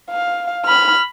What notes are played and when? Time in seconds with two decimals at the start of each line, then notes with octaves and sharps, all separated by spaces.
0.10 F5
0.66 B5 F6